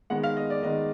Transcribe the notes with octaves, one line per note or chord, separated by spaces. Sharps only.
D#3 G#3 B3 F#5
F5
D#5
D5
D#3 G#3 B3 D#5